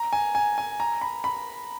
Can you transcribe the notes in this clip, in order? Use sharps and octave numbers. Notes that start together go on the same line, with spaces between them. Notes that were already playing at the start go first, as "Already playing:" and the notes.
Already playing: A#5
G#5
G#5
G#5
A#5
B5
B5